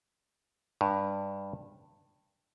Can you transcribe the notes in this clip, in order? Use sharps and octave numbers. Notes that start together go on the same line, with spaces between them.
G2